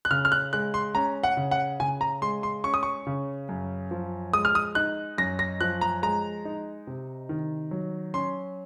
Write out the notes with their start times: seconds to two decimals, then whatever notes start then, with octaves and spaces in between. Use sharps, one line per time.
0.05 F#6
0.11 C#3 F6
0.25 F6
0.32 F#6
0.53 G#3 F#6
0.74 C6
0.95 C#4 A#5
1.23 F#5
1.37 C#3
1.51 F#5
1.80 C#3 G#5
2.01 A#5
2.22 G#3 C6
2.43 C6
2.64 C#4 C#6
2.74 D#6
2.83 C#6
3.07 C#3
3.49 F#2
3.91 F3
4.33 G#3 D#6
4.45 F6
4.55 D#6
4.75 D#4 F#6
5.18 F#2 A#6
5.39 A#6
5.61 F3 F#6
5.81 A#5
6.02 G#3 A#5
6.45 D#4
6.87 C3
7.29 D#3
7.71 F#3
8.14 C#4 C6